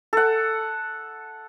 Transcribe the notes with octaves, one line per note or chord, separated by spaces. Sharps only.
A4 F#5